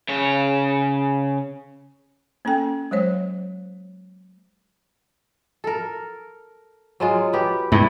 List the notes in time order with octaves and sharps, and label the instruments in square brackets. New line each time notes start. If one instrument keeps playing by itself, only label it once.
[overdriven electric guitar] C#3 C#5
[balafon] A#3 C#4 A4 G5
F#3 G#3 C5 C#5
[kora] A4 A#4
F#3 G#3 F4
B3 G4
[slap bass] G2 [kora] E4